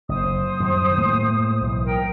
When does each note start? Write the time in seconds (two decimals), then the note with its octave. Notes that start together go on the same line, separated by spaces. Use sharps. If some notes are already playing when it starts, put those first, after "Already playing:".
0.09 F#1 C5 D#6
0.60 F#2 D#3 G3
0.98 A2 G#3 A#3
1.61 B1 E3
1.85 A#4 G5